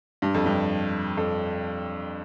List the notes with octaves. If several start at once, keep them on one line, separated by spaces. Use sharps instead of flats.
G2
F2
G2
F2